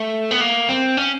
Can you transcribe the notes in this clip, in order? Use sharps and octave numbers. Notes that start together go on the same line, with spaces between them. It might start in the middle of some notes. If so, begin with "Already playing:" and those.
Already playing: A3
B3
A#3
C4
C#4